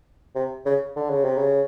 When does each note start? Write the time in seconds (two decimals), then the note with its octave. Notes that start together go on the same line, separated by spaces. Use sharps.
0.35 C3
0.66 C#3
0.96 D3
1.10 C#3
1.24 C3
1.38 C#3